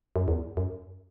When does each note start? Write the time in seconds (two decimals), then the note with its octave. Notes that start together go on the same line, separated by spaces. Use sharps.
0.16 F#2
0.28 E2
0.57 F#2